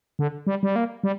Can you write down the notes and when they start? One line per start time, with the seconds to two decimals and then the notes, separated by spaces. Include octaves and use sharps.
0.19 D3
0.47 G3
0.63 G3
0.76 A#3
1.04 G3